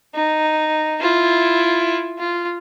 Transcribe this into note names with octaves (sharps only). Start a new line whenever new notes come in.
D#4
E4 F4
F4